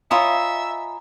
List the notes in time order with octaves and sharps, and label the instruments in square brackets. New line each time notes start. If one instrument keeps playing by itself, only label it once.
[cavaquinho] F4 C#5 D#5 [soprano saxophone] E5 [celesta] G#5 A#5 B5